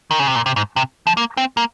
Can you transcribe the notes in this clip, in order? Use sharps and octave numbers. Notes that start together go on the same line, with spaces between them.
D#3
C#3
C3
A#2
C3
G#2
C3
F3
A#3
C4
A#3